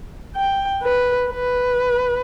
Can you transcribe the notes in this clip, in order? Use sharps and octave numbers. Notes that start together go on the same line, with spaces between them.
G5
B4
B4